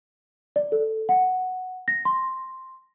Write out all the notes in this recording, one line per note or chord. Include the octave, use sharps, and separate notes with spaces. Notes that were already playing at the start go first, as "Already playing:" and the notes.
D5
A4
F#5
A#6
C6